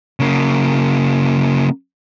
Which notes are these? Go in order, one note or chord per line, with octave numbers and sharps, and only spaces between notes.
C#3 A#3